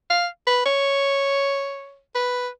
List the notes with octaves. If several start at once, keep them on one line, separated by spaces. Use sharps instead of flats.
F5
B4
C#5
B4